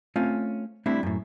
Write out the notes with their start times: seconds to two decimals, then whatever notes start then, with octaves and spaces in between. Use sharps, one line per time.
0.16 A3 C4 C#4 F4
0.86 G3 A3 C4 D4 E4
1.03 F#2 A2